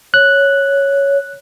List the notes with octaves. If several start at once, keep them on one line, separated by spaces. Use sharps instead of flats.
C#5 F#6